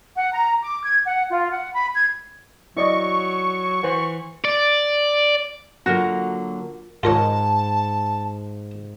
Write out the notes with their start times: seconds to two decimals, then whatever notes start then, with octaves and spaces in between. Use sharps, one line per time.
0.15 F#5
0.33 A#5
0.63 D6
0.83 G#6
1.06 F#5
1.30 F4
1.50 F#5
1.73 B5
1.95 G#6
2.77 F#3 E4 D5 D#5 C#6
3.83 E3 C5 F#5
4.45 D5
5.86 D3 F#3 A#3 F4 F#4 A#4 A#6
7.03 G#2 F4 A#4 C#5 A5